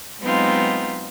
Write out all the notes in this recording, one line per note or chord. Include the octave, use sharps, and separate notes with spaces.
F#3 G#3 B3 C4 D#4 F4